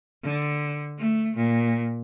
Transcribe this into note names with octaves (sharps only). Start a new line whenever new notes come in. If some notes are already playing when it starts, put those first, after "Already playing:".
D3
A3
A#2